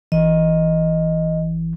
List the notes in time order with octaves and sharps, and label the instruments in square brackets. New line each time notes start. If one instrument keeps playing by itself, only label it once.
[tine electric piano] G#1 E3 [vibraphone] D#5